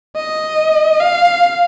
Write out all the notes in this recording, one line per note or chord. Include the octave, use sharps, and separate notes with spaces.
D#5
F5